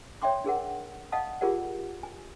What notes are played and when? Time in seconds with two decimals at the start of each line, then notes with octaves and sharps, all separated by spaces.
0.22 C#5 D5 E5 G5 C6 D6
0.44 D4 G#4 A#4 F#5
1.12 D5 D#5 F5 F#5 A5 D#6
1.41 F4 G4 G#4 A#4 D5 F#5
2.03 G#5